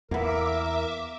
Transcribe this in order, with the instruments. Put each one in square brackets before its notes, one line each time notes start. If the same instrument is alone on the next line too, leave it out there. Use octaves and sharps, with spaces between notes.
[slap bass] E2 [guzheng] A#3 B3 [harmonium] A#4 [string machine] E5 D6